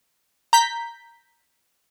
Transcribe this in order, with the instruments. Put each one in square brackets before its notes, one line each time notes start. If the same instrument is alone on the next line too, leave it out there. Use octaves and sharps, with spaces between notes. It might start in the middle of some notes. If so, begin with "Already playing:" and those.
[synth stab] A#5 G6 B6